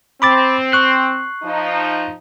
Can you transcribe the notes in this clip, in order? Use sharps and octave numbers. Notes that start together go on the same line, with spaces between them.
C4 B5 D6 A6
C#6 F#6 C7
F3 D#4